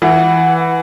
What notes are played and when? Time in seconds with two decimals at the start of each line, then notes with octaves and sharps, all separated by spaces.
0.02 E3 F#5